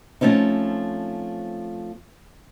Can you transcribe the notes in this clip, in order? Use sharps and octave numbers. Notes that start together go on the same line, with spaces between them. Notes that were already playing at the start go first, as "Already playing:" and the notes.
F3 A3 C4 C#4 D#4